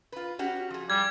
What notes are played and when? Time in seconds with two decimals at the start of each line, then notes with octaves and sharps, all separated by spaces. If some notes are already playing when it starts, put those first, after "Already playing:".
0.12 F4 B4
0.39 C#4 F#4 G4
0.70 F3 G#4
0.90 G3 G#6